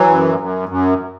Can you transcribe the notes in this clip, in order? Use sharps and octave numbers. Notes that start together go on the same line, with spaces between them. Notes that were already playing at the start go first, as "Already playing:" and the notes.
Already playing: E3 F#3
F#2
F#2
F#2